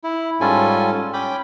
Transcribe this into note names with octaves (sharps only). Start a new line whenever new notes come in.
E4
G#2 G3 C#4 F4 A4 G#5
C#4 G5 B5 D6